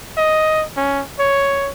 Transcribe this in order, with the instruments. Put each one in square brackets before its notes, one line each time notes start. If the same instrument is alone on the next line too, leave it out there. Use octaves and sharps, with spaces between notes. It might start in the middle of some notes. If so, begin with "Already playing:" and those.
[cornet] D#5
C#4
C#5